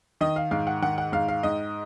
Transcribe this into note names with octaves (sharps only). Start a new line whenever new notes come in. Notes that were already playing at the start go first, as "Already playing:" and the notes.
D#3 D#5
F5
G#2 F5
F#5
D#3 F#5
F#5
G#2 F5
F5
G#2 D#5